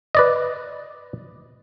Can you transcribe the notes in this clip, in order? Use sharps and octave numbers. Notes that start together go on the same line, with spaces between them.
B4 D5 D#5